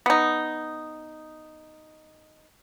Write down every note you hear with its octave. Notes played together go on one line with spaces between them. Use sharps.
B3 D#4